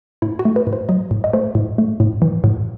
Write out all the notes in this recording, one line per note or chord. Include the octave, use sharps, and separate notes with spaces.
A2 E4
F#4
A3
B4
A2
C5
F#3 D#5
A2
D#5
A3 C5
A2
A3
A2
E3
A2